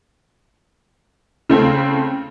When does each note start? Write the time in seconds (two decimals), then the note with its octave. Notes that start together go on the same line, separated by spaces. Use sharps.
1.49 C#3 A3 C4